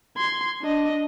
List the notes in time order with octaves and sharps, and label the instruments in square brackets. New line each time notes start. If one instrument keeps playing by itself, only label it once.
[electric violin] C6 G#6
D4 D#5